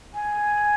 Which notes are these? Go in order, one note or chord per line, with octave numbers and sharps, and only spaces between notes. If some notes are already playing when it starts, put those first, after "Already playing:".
G#5